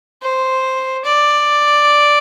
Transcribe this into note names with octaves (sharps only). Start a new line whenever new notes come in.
C5
D5